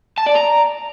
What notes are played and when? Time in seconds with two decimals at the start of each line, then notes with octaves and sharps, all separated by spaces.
0.18 A5
0.27 D5
0.36 A#5